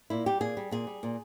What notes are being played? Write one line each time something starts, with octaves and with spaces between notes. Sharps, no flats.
A#2 E4
G3 G4
A#2 G#4
G3
A#2 G#4
G3
A#2